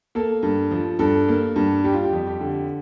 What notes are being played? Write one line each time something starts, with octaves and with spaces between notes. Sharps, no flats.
A#3 A4
G2
F3
G2 A4
A#3
G2
G3 G4
F4
G4
F2
G4
D3